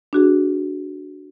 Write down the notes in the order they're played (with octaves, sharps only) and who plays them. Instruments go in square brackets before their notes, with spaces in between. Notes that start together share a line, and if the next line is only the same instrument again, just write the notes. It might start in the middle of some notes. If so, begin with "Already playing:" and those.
[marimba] D4 F#4 G#4